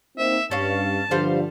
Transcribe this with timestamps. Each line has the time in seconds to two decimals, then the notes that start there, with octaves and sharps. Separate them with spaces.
0.18 A#3 C4 D#4 E5
0.51 G2 C#4 F5 A5
1.11 G2 D3 F3 G3 C5 F5